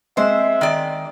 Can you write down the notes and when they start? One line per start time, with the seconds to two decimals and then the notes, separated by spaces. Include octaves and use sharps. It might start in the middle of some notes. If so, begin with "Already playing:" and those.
0.17 G#3 C4 C5 E5
0.61 D#3 D5